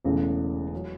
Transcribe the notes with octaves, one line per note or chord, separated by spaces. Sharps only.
E1 E2 C#3 A3 C#4
F#3